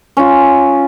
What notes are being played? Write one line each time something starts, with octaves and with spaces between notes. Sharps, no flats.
C#4 F4